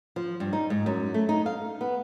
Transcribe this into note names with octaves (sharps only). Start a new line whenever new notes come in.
F3
G2
D#4
G#2
F#2
A3
D#4
F5
B3